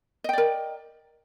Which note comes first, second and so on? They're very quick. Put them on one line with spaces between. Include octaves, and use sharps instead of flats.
D#5 G5 D5 A#4